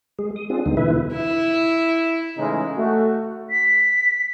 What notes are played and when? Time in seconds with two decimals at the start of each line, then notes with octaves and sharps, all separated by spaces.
0.19 G#3 G#4
0.36 D#6
0.50 C4 D4 F4 G#4
0.66 D#2 D3 G#3 B3 D#4
0.77 B2 D3 E3 E4 B4 E5
1.13 E4
2.37 A2 C#3 E3 G#3 C#4 D#4
2.76 A3 F#4
3.50 B6